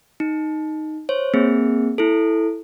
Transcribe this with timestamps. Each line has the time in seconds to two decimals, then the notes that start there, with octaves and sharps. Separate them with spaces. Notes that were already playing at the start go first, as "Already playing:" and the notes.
0.20 D#4
1.09 C5 C#5
1.34 A#3 C4 G#4
1.98 E4 A4